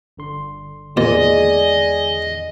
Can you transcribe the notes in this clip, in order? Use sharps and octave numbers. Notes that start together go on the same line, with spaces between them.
G1 D3 C6
E2 A#2 D3 D#3 G#3 G#4 D5 D#5